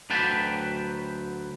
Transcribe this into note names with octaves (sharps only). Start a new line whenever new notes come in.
D2 F#3 B4 G5 A5 B5